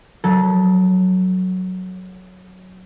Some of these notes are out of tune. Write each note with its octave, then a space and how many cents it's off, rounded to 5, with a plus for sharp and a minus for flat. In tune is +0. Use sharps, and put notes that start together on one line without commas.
F#3 +0 A4 +0 A#5 +45